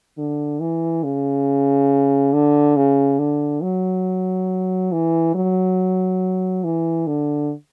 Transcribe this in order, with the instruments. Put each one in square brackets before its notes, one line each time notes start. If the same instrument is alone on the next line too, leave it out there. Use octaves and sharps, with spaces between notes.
[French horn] D3
E3
C#3
D3
C#3
D3
F#3
E3
F#3
E3
D3